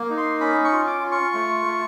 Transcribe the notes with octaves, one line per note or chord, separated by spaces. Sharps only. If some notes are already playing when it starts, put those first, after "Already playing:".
Already playing: A#3
D#4
C6
C#4 B5
C#6
F4
D6
F4
C#6
A3
A3